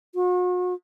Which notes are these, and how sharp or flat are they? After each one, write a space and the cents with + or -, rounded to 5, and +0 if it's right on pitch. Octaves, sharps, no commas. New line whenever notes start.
F#4 -40